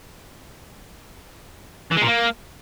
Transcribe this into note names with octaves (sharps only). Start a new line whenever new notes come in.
E3
G#3
A#2
A#3